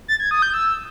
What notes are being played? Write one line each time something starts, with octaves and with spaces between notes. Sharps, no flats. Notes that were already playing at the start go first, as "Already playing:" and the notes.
A6
G#6
D#6
G6
E6